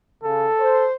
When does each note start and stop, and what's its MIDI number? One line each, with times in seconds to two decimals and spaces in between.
0.23 0.45 49
0.23 0.88 69
0.59 0.95 72